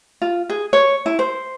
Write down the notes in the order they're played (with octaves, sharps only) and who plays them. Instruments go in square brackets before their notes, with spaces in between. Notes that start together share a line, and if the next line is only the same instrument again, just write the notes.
[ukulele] F4
G#4
C#5
E4
C5